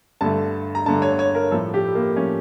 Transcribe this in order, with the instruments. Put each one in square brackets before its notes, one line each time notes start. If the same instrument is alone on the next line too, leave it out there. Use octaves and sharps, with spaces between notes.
[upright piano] G2 D3 A3 A5
A#5
G2 D3 A3 A5
C#5
C#5
A#4
A2 F3 A3 A4
G4
A#3
A2 F3 A3 C#4